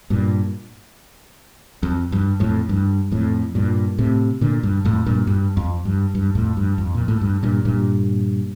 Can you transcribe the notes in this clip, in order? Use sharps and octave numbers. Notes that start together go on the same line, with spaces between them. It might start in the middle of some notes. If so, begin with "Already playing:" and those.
G2 A#2
F2
G2
F2 A2
G2
F2 A2
G2 A#2
A2 C3
A#2 D3
G2
F2 A2
G2 A#2
G2
F2
G2
G2
F2 A2
G2
F2
A#2
A2
G2
G2 A#2
G2 A#2